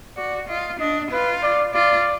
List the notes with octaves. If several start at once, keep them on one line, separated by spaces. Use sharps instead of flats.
F#4 D5
F4 D#5
D4 D#5
F4 B4
D5
F4 D5